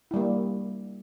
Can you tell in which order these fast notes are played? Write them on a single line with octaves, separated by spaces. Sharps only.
E4 G3 A#3